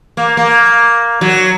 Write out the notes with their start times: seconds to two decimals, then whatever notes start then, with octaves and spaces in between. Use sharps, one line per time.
0.17 A#3
0.37 A#3
1.21 F#3